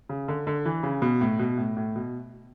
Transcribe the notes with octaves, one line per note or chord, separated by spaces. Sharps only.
C#3
D3
D3
E3
C#3
B2
A2
B2
A2
A2
B2